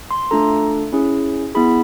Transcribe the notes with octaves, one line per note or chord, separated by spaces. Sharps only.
C6
A3 D4 F4 A4 A#5
C#4 E4 G#4
B3 E4 G#4 B5